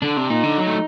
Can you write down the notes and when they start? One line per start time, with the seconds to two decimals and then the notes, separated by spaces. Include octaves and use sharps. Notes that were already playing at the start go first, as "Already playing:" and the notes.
0.02 D3 D4
0.17 C3
0.30 A#2 D#4
0.43 D3
0.57 F#3
0.67 A3